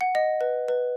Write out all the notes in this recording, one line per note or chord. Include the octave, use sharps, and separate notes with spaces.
F#5
D#5
B4
B4